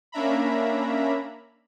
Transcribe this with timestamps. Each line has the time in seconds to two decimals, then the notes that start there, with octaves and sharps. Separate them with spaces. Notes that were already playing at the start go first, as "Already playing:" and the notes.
0.12 A#3 C#4 D4 E5 A#5 B5